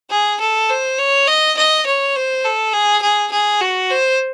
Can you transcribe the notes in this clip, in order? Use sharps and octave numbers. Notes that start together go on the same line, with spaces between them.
G#4
A4
C5
C#5
D#5
D#5
C#5
C5
A4
G#4
G#4
G#4
F#4
C5